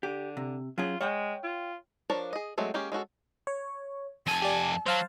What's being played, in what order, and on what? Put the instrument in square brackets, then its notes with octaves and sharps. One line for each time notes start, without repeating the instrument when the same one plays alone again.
[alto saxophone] D3 [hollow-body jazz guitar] G4
[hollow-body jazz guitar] C3
[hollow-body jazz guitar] F#3 C#4 G#4 [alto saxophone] F4
[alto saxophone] G#3 [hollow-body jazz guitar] C#5 F#5 G5
[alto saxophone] F4
[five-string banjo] F3 D4 A#4 C#5 A5
G#4 D#5
F#3 G#3 A3 C4
G#3 A#3 C#4 G4
G#3 C#4 F#4 A4
[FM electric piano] C#5
[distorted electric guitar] F2 G#5 [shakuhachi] A5
[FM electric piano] G4 D5
[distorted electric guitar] F#3 [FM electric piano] C5 F5 A5